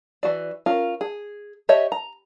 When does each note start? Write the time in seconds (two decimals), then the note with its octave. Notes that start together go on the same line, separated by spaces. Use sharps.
0.23 E3 F#4 D5
0.66 C#4 F4 A#4
1.01 G#4
1.69 G4 C#5 D#5 E5
1.92 A#5